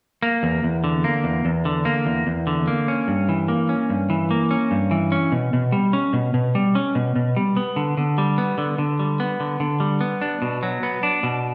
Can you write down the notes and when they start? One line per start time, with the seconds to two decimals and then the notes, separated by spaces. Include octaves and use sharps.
0.22 A#3
0.43 E2
0.63 E2
0.84 D3
1.04 A#3
1.24 E2
1.45 E2
1.65 D3
1.85 A#3
2.06 E2
2.27 E2
2.47 D3
2.67 A#3
2.88 C#4
3.08 G2
3.29 E3
3.48 A#3
3.69 C#4
3.90 G2
4.10 E3
4.31 A#3
4.51 C#4
4.71 G2
4.91 E3
5.12 C#4
5.32 B2
5.53 B2
5.72 G3
5.93 C#4
6.13 B2
6.34 B2
6.55 G3
6.75 C#4
6.95 B2
7.16 B2
7.36 G3
7.57 B3
7.76 D3
7.97 D3
8.18 G3
8.38 B3
8.58 D3
8.78 D3
8.99 G3
9.20 B3
9.40 D3
9.60 D3
9.80 G3
10.01 B3
10.21 D4
10.42 B2
10.63 F#3
10.83 B3
11.03 D4
11.23 B2